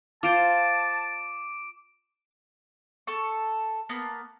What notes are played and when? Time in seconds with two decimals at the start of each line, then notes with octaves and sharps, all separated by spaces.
0.23 F4 C5 A5 D6 D7
3.07 A4 C#6
3.89 A#3 B3 A#4 A5